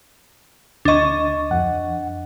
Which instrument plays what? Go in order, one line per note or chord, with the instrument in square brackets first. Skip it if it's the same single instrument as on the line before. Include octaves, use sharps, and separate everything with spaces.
[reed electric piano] D2 C#6 [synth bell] D4 D#5
[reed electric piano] F2 F#5